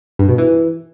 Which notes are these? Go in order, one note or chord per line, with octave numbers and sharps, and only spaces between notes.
G2
B2
E3